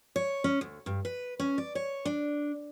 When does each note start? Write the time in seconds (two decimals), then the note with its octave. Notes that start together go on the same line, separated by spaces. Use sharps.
0.16 C#5
0.44 C#4
0.61 D2
0.86 G2
1.05 B4
1.39 C#4
1.58 D5
1.75 C#5
2.05 D4